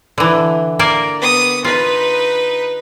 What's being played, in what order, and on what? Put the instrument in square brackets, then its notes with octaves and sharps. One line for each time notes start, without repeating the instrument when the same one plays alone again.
[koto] D3 E3
A#3 A#4 D5
[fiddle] B3 D#6
[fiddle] D#4 B4 [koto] F4